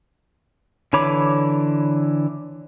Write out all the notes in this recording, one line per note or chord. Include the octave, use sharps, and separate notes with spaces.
D3 E3 C#5 B5 D6